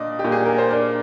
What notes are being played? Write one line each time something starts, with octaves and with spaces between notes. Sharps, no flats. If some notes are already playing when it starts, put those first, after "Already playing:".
Already playing: A#2 D4 D5 D#5
G4
A#2
G#4
A#4
C5
D4 A#4 D5